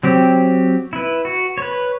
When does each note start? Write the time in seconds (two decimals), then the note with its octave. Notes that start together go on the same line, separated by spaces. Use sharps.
0.03 F#3 C4 G4
0.93 E4 B4
1.25 F#4
1.57 B4 C#5